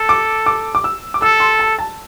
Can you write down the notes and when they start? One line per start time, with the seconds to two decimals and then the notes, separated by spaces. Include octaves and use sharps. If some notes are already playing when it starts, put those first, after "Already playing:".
Already playing: A4
0.09 D6
0.46 D6
0.75 D6
0.84 E6
1.14 D6
1.22 A4 E6
1.40 C6
1.59 A5
1.79 A5